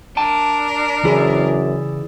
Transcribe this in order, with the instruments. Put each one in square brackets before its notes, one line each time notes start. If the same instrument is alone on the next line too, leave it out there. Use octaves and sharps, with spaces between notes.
[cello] D4 A#4 [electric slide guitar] G5 A5
[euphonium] F#2 [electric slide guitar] C#3 E4 [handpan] E3 G#4 D5